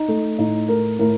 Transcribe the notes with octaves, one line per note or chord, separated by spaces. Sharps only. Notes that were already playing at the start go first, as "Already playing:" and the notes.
Already playing: D#4
A3
A2 D#4
A3 A#4
A2 A#4